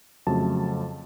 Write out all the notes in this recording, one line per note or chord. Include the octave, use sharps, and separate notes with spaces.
F2 C#3 F#3 A3 A5